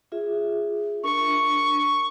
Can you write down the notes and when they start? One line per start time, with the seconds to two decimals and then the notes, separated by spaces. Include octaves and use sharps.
0.12 F4 G#4 E5
1.04 D4 A#4 C#6